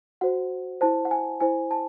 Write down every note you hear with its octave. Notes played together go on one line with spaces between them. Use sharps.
F#4 C5 F#5
E4 C5 A5
F#5
G#5
E4 C5 G#5
A5